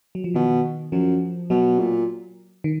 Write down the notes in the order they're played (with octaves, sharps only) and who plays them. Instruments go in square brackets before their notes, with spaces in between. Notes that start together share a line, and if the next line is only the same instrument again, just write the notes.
[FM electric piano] F#3
F3
[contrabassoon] B2 [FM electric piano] D#3
[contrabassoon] F#2 [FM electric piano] F3
[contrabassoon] B2 [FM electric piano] F#3
[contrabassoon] A#2
[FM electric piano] D#3